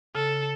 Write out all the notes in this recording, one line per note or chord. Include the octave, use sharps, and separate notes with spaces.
C#3 A4